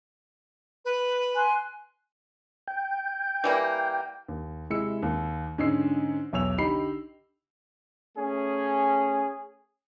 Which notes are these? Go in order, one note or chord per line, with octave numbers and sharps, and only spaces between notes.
B4
G#5 C6 F#6
G5
E3 G3 A#3
D#2
C3 G#3 E4 E6 C#7
D#2
G#2 D3 C#4 D#5 E6 C7
B1 E2 C#5 E6 F7
D3 D#4 G4 B5 C7
A3 C#4 G#4